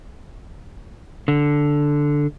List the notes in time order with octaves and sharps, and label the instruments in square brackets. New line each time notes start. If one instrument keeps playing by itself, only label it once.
[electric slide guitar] D3